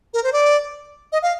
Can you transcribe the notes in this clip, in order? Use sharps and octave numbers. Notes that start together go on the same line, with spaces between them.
A#4
C5
D5
D#5
F5